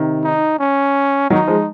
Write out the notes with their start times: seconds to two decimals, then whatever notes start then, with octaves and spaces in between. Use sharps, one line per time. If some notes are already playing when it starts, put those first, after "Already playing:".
Already playing: C3 D#3
0.23 D#4
0.59 C#4
1.30 D#3 F#3 D#4
1.47 F3 G#3